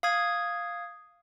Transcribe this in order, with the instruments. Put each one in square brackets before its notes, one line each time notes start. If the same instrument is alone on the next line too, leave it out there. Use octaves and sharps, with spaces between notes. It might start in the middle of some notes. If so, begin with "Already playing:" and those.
[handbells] F5 D#6 G#6